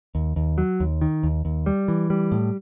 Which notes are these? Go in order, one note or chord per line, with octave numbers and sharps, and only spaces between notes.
D#2
D#2
F#3
D#2
D#3
D#2
D#2
G3
E3
G3
A2